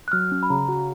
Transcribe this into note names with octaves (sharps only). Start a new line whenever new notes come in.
F#6
F#3 F6
C#4
B5
C#3 A#5
F#4